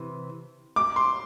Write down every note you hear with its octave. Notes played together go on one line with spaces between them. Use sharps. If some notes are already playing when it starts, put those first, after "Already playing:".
Already playing: C3 E3
D6
C6